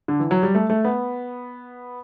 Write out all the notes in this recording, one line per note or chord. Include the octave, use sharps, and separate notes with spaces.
D3
E3
F#3
G3
A3
A3
B3